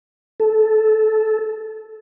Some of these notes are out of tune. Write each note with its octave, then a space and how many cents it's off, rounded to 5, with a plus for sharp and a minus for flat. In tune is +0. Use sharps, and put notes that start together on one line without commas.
A4 -15